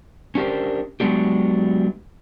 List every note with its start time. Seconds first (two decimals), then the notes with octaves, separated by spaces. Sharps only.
0.35 C#4 D4 G4 A#4 C5
1.00 F#3 G#3 B3 D4 G4